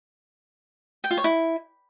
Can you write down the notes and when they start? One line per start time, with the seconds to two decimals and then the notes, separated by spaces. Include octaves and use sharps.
1.04 G5
1.11 F4
1.17 C#5
1.24 E4